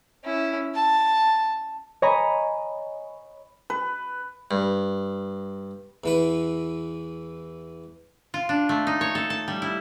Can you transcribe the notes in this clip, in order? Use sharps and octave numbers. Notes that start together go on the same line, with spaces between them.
C#4 E4
A5
C#5 D#5 G#5 A#5 B5
B4
G2
E2 E3 B4
F4
D4
A3
D#4
C#5
A4
A5
G3
E4